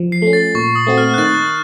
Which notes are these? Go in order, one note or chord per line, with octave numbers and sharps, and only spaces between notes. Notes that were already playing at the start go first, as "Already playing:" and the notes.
Already playing: F3
C7
A3 C#4
A6
A#2 C#6
D#6
A3 C4 F#4
F6
F#6
D#3 A6